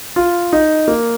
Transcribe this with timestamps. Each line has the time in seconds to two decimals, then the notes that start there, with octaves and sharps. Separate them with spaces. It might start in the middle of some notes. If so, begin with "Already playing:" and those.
0.16 F4
0.53 D#4
0.88 A#3